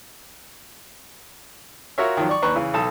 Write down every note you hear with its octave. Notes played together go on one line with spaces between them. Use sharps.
F4 F#4 A#4 C#5 E5
D#3 F3 F#3
D5 C#6
D#2 D4 B4 A#5 C#6
C#3 E3
B1 A4 A5 D#6